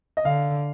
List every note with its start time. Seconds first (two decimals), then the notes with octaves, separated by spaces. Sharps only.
0.17 D#5
0.25 D3 F5